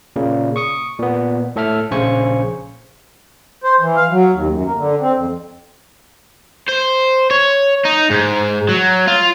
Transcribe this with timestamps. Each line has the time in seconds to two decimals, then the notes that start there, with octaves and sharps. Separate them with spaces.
0.16 A#2 C#3
0.56 C#6 D#6 C#7
0.99 A#2 B3
1.56 A2 A4 E5 F6
1.91 A#1 C#3 C5 G#5 C#6 C#7
3.64 C5
3.80 E3
3.96 F5
4.12 F#3
4.33 D#2
4.52 F#2
4.65 A#3
4.77 D3
5.01 C4
5.15 F2
6.68 C5
7.31 C#5
7.85 D#4
8.10 G#2
8.69 F#3
9.07 F4